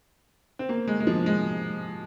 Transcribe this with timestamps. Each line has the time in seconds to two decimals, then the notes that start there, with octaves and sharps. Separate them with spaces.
0.59 C4
0.69 A#3
0.88 G#3
1.00 G#3
1.07 F3
1.26 G#3